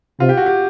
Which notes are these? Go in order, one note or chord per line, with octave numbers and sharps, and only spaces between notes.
C3 F4
G4
F#4
G4